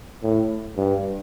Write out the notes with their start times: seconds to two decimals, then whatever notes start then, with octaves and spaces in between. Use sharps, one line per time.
0.23 A2
0.77 G2